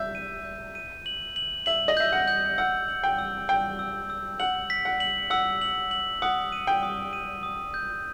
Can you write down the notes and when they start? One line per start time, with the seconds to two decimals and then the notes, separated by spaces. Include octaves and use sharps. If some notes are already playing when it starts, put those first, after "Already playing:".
Already playing: E5 G6
0.15 D#7
0.44 G6
0.75 D#7
1.06 F#7
1.36 F#7
1.66 E5 F#7
1.88 D#5
1.97 E5 G6
2.12 F#5
2.28 G6
2.58 F#5 E6
2.88 F#7
3.04 G5
3.18 E6
3.49 G5 E6
3.79 E6
4.10 E6
4.40 F#5 F#7
4.70 B6
4.85 F#5
5.00 F#7
5.30 F#5 E6
5.61 F#7
5.91 F#7
6.22 F#5 D#6
6.52 D#7
6.67 G5
6.83 D#6
7.13 D#7
7.43 D#6
7.74 G6